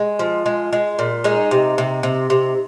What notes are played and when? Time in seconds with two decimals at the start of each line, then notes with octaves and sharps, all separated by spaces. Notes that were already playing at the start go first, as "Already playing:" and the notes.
Already playing: G#3
0.19 F3
0.46 G#3
0.73 G#3
0.99 A#2
1.24 G#3 D#4
1.51 C3
1.78 C3
2.03 C3
2.30 C3